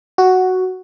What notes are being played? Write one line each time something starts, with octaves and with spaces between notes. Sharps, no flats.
F#4